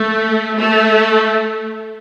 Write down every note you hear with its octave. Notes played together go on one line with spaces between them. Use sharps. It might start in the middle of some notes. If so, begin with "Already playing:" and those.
Already playing: A3
A3